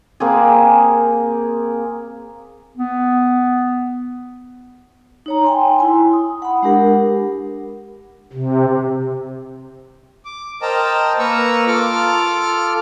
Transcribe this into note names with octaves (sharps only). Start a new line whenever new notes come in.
A#3 C4 G#4
B3
D#4 C#5 A#5
G5 G#5 C6
E4 G#5 C6
D#6
F#5 B5
G#3 D4 G4 A#4 F#5
C3
D6
A#4 C5 D#5 G5 A5 A#5
A#3 A#4 B4 A#5 C#6 E6
F4 A4 D6 F6